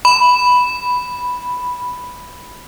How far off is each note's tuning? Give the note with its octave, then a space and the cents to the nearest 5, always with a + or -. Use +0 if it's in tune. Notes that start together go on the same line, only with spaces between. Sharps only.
B5 +0